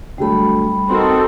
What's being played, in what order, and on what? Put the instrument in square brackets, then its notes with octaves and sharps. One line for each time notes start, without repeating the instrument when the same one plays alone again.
[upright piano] D3 F#3 A3 [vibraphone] G3 B5
[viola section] C4 F#4 [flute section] D#4 A4 [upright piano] A#4 C6